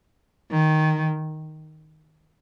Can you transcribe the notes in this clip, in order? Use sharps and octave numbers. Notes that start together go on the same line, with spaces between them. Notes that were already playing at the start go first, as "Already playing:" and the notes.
D#3